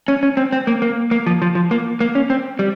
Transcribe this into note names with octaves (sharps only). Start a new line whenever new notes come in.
C#4
C#4
C4
C4
A#3
A#3
A#3
F3
F3
F3
A#3
A#3
C#4
C4
G3